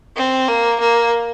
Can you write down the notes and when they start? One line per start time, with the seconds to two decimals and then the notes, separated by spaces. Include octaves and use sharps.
0.16 C4
0.48 A#3
0.80 A#3